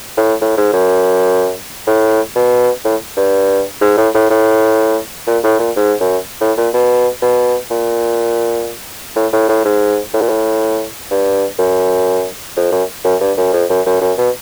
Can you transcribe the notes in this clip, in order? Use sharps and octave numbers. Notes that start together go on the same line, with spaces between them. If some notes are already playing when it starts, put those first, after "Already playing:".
A2
A2
G#2
F#2
A2
B2
A2
G2
G#2
A2
A2
A2
A#2
A2
A#2
G#2
F#2
A2
A#2
B2
B2
A#2
A2
A2
A2
G#2
A2
A#2
A2
G2
F#2
F2
F#2
F#2
G2
F#2
F2
F#2
F#2
F#2
B2